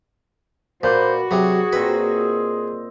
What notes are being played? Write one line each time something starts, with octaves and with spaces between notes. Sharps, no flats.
A#2 F#4 B4 C5 D5
C3 F#3 G#4
A#2 C4 B4 D#5